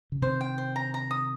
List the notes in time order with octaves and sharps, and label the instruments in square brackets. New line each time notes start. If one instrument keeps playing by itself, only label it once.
[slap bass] C#3
[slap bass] C3 D#3 [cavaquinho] C5
[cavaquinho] G5
C5
A#5
A#5
D#6